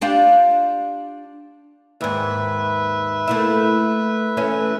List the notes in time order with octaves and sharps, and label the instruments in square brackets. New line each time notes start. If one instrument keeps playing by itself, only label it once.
[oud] D4 F4 G4
[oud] D#2 G#2 [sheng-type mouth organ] B4 E5
[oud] A3 A#3 E4
E3 A3 C#4